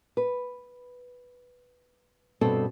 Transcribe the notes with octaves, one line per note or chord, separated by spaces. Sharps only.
B4
G2 B2 C4 A4